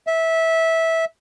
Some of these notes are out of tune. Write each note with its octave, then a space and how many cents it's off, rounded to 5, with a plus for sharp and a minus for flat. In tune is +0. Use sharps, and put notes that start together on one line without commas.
E5 -15